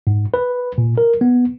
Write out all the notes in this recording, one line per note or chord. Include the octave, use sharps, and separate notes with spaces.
G#2
B4
A#2
A#4
B3